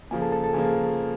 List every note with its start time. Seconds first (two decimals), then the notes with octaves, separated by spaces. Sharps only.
0.11 C#3 F3 A#3 G#5
0.21 A4 A5
0.32 A4 A5
0.44 A4 A5
0.54 C#3 F3 A#3 G#4 G#5